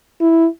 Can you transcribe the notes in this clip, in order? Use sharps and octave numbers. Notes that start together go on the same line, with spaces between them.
E4